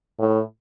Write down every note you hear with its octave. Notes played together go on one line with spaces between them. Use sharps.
A2